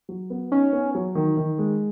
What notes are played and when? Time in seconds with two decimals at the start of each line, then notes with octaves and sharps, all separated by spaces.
0.09 F#3
0.30 B3
0.52 C#4 D#4
0.73 B3
0.95 F#3
1.15 D#3
1.37 D#3
1.58 G#3